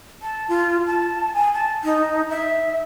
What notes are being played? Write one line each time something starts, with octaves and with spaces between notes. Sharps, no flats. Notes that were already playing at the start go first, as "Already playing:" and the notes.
A5
F4
A5
G#5
A5
D#4
E5